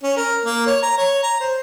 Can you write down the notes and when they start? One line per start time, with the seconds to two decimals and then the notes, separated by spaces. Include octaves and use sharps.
0.03 C#4
0.17 A#4
0.46 A#3
0.67 C#5
0.83 A#5
0.98 C#5
1.23 A#5
1.40 C5